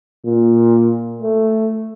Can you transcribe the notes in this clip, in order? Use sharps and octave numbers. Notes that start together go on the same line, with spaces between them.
A#2
A3